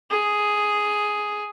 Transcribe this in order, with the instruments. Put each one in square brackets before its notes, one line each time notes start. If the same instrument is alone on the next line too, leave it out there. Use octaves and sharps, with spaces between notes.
[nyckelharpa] G#4